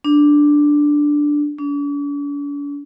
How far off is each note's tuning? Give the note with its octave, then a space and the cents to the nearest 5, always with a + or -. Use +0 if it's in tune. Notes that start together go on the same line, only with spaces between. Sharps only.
D4 +0
D4 -45